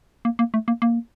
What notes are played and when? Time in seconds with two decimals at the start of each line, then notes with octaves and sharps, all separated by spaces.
0.25 A#3
0.39 A#3
0.54 A3
0.68 A#3
0.82 A#3